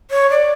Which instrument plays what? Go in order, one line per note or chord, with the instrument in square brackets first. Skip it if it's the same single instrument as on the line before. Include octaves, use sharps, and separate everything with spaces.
[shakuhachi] C#5
D5